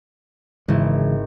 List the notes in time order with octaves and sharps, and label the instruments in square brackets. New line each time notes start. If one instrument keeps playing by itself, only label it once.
[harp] G#1 E4 [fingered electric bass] C#3 E3 G#3